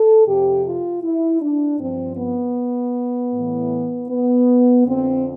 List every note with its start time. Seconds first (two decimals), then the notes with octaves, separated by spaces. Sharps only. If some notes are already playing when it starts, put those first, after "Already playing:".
Already playing: A4
0.26 F2 C3 F3 G4
0.64 F4
1.03 E4
1.42 D4
1.80 G2 F3 C4
2.17 B3
3.33 A2 E3
4.10 B3
4.86 F2 D3 F3 C4